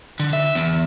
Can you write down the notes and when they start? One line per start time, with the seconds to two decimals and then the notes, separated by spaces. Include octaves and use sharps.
0.20 D3
0.33 E5
0.55 E2